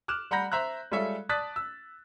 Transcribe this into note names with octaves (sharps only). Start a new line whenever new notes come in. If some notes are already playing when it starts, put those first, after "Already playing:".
D6 F6 F#6 E7
G3 F#5 A#5 B5 G6 A#6
C5 E5 A#5 F#6
G3 G#3 F4 A4 C#5 E5
D5 A5 D#6 F#6 A6 B6
E6